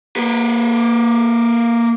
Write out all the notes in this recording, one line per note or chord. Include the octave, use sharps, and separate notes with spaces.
A#3 B4